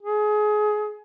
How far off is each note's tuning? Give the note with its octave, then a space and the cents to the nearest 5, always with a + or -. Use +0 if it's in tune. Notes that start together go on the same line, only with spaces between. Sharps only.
G#4 +25